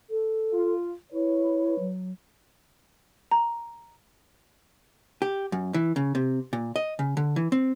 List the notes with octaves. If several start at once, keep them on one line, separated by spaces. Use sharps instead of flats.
A4
F4
E4 B4 C#5
F#3
A#5
G4
F#2
E3
C#3
C3
A#2
D#5
C#3
D3
E3
C4